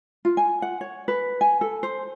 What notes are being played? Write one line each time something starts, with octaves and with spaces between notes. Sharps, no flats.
F4
G#5
F#5
C#5
B4
G#5
A4
C5